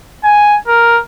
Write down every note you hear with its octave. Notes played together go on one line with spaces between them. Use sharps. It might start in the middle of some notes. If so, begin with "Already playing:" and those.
G#5
A#4